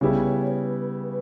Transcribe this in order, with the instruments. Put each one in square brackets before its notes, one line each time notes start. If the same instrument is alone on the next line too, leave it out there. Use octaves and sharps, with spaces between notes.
[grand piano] C#3 G3 B3 E4 G4 [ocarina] C#5
[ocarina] B4